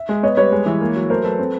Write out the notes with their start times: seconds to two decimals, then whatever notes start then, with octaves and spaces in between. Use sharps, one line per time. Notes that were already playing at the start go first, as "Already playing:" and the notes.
Already playing: E5
0.09 G#3
0.23 B3 C#5 D#5
0.37 G3 B4 C#5
0.52 G#3
0.66 E3
0.81 A#3
0.96 F#3
1.10 A3 A#4 C5
1.24 F#3 A4 B4
1.39 C4